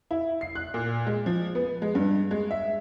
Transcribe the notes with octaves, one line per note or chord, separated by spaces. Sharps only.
E4
C7
F#6
A#2
G#3
F3
B3
G#3
G2
G#3
E5